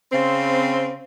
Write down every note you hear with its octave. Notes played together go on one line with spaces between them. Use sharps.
C#3 C4